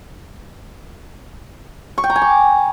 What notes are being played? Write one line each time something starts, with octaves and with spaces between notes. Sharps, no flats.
C#6
G5
A#5
G#5
D6